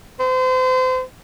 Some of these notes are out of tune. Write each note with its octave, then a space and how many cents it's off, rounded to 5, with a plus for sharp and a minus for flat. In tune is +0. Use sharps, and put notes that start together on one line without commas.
C5 -35